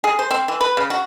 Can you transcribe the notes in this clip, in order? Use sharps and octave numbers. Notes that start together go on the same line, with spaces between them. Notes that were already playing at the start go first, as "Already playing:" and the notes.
G#4
C5
C4
E3
B4
C#3
F#4